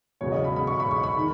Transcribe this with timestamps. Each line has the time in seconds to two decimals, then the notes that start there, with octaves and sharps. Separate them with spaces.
0.21 E1 E2 C#3 F#3 C#5
0.32 D#5
0.44 B5
0.56 B5
0.67 C#6
0.80 B5
0.91 C#6
1.04 B5
1.17 D#3